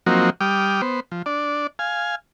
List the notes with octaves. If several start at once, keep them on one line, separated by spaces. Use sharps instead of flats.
F3 F#3 A#3 C4 D#4 F#4
G3 G5 D6 D#6 F6
B3 C5
F3
D4 D5
F5 G#5